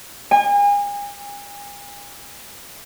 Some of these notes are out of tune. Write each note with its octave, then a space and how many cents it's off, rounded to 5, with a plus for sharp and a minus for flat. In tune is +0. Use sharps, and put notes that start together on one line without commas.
G#5 -35